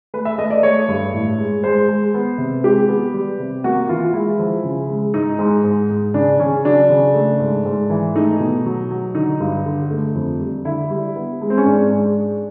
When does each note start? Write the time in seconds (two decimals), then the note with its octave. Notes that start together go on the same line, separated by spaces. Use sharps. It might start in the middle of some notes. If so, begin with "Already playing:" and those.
0.14 A3 B4
0.25 E5
0.38 A3 D#5
0.50 D5
0.63 A3 C#5
0.88 G2
1.13 A2
1.39 G#3
1.63 G#3 C5
1.88 G#3
2.14 B3
2.38 C3
2.64 G#3 G4
2.89 B3
3.14 G3
3.39 C3
3.64 A#3 F#4
3.89 E3 F4
4.14 G#3 E4
4.39 F3
4.64 C#3
4.89 G#3
5.14 G#2 D#4
5.39 G#2
5.64 G#2
5.90 G#2
6.14 C#3 D4
6.40 C#3 C#4
6.65 F#3 D4
6.90 C#3
7.14 A3
7.40 G#2
7.65 G#2
7.90 E3
8.15 A3 D#4
8.40 B2
8.66 F#3
8.91 F#3
9.15 D3 D#4
9.40 G2
9.66 D3
9.91 A3
10.15 F2
10.41 G3
10.65 D3 E4
10.90 G3
11.16 B3
11.41 G#3
11.50 C4
11.58 C#4
11.65 G#2 D4
11.90 G#3